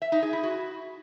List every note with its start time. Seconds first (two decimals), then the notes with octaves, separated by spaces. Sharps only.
0.02 E5
0.12 D#4
0.22 G#4
0.33 E4
0.43 F#4